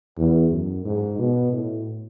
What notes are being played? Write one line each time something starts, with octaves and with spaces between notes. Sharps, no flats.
E2
F#2
G#2
B2
A2